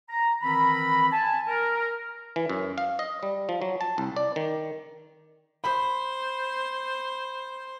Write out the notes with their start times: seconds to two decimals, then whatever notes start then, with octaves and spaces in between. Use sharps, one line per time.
0.09 A#5
0.42 D#3 E3 C4 A#5 B5
1.12 G#5 A5
1.47 A#4
2.36 E3
2.49 F#2
2.78 F5
2.99 D#5
3.23 G3
3.49 F3
3.62 F#3
3.81 A5
3.98 C2
4.16 D5
4.36 D#3
5.64 C5 B5